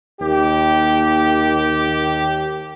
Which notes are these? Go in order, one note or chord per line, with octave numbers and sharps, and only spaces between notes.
D#2 G4